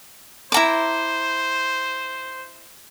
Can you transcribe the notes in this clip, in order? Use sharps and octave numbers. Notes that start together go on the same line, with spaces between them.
E4 C5 A#5 D6